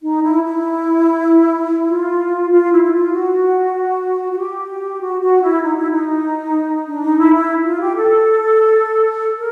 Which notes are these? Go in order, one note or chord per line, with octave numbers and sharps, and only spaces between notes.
D#4
E4
E4
F4
F4
E4
E4
F4
F#4
F#4
G4
F#4
F#4
E4
D#4
E4
D#4
D4
D#4
E4
E4
F4
G4
A4
A#4